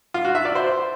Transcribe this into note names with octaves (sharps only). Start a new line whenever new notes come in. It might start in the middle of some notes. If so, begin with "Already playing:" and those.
F4
F#4
E5
D5
C5